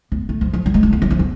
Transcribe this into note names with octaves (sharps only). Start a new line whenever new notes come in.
B3
A3
F3
F3
F#3
G#3
D4
B3
F#3
F3
B3